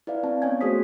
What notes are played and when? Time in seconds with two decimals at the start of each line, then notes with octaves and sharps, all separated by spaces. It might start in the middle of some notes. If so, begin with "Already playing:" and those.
0.07 E4 B4 D5 F5
0.23 C4 F5 A5
0.42 B3 C#4 C#5 D#5 G#5 G#6
0.61 A3 F#4 G#4 C5 D#6 B6